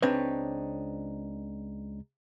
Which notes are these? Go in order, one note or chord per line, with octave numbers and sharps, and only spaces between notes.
C#2 C4 D4 D#4 B4 C#5